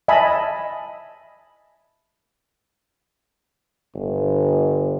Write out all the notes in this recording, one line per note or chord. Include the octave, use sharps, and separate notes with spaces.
D#5 E5 G#5 A5 B5
G1